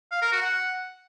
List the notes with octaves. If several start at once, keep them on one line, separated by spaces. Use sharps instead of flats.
F5
A#4
F#4
F#5